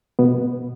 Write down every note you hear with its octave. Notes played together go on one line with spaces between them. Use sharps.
B2 B3